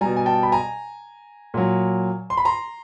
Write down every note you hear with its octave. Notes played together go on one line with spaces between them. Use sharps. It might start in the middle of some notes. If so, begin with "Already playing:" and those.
B2 G3 G#5 A#5
G#5
G5 A5
B5
G#5 A#5
A#2 F#3
C6
B5
A#5 C6